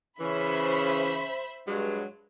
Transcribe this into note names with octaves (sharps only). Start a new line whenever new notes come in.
C#3 E3 C#4 C5 E5 B5
G2 F#3 G#3